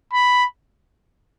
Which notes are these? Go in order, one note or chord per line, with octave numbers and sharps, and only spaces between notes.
B5